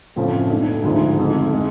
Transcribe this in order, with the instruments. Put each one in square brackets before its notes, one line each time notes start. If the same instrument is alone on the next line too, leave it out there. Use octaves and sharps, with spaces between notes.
[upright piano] F#1 F2 F3 A3 C#4 [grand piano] A2
[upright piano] B1 B2 A3 D4
[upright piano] D2 D3 F3 G#3 [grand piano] G#2
[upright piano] F#1 F2 D3
G#3